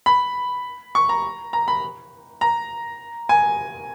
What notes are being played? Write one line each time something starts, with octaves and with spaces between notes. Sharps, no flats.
B5
C#6
A#5
A#5
B5
A#5
G#5